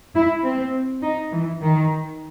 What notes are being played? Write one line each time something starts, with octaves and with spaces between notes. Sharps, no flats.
E4
C4
D#4
E3
D#3